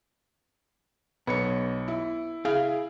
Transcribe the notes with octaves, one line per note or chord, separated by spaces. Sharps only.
B1 B3 C#5 C#7
E4
E4 G#4 F5